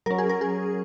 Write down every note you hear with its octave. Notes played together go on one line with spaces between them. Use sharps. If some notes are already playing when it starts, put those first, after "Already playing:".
F#3 C#4 A#4
G#4
A#4
G#4